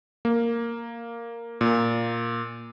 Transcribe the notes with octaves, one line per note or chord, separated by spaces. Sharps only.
A#3
A#2